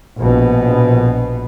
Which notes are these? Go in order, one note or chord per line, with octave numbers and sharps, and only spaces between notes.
A#1 B2